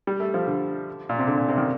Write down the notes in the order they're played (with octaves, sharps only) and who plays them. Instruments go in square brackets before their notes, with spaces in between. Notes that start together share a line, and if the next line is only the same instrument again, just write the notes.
[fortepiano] G3
A3
F3
D3
A#2
C3
D3
A#2
C3
D#3